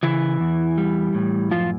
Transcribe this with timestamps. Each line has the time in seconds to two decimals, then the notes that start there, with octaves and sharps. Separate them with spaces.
0.03 C#3 E3 E4
0.40 E2
0.78 G3
1.14 A2
1.51 F#2 F3 F4